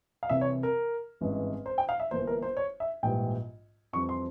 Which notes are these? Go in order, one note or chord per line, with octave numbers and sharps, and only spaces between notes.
F5
C2 C3 E3 E5
C#5
A#4
G#1 G2 E3 G#3 C#4
C5
G5
F5
E5
G1 G2 E3 A#3 C5
A#4
C5
C#5
E5
A#1 G#2 E3 G3 G5
F2 E3 G3 C4 C#6
C6